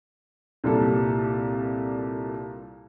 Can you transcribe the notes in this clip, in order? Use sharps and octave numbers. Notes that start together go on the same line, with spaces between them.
C2 A#2 G3 A4